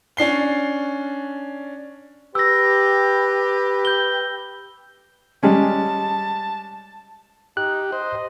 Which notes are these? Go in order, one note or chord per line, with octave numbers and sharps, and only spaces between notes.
C#4 D4 C7 G7
G4 B4 E6 A#6
G6 G7
G3 G#3 C#4 A5
D#4 G4 F#6
C5 D#5